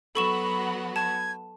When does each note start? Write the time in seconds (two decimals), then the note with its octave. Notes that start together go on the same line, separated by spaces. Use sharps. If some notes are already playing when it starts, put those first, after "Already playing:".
0.15 F#3 B3 F#4 A4 B5 C#6 E7
0.96 A5 G#6